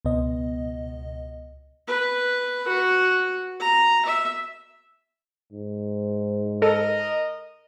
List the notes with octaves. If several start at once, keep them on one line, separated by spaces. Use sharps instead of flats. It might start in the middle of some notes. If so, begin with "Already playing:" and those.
C#2 B2 B3 D#5
B4
F#4
A#5
E5
G#2
A4 A#4 D#5